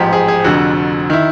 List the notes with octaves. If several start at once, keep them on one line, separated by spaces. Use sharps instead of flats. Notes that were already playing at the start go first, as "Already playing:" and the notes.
Already playing: A1 G#2 F3 G4
G#4
G#4
F1 F2 D3 F#4
D#3 E4